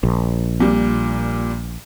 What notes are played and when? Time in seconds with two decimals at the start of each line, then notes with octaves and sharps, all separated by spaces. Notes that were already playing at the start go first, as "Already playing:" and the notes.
0.03 A#1
0.60 A#2 G3